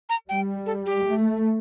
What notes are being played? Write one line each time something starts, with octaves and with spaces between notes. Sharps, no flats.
A#5
G3 G5
A4
G4
A3